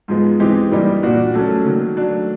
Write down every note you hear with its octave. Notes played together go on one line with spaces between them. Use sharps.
G#2 F3 G#3 B3
E3 G#3 C4 D#4 G4
G2 E3 G3 A#3 D#4
A#2 G3 A#3 D4 F#4
F#3 A3 C#4
D#3 F#3 A#3
F#3 A3 D4